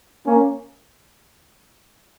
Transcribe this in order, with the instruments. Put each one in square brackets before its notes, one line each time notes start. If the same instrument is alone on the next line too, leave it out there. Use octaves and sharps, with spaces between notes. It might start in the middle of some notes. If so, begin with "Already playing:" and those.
[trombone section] A#3 C#4